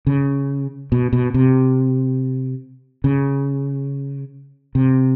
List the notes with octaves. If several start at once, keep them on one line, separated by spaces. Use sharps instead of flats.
C#3
B2
B2
C3
C#3
C3